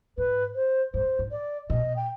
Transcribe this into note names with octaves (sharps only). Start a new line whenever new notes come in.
G#2 B4
C5
G2 C5
G#2
D5
B2 D#5
G5